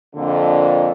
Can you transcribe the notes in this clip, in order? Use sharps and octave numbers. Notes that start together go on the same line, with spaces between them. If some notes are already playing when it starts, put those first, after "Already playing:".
F2 A#2 D3